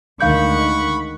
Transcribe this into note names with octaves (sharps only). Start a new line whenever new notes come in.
D2 D#3 G#3 F5 F#5 B5 C#6 G6